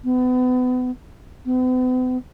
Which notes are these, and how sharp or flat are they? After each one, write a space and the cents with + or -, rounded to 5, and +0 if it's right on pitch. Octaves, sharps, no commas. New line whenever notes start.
B3 +30
B3 +45